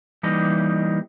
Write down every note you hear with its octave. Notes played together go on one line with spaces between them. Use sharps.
E3 G3 A#3 D#4 G4 D#5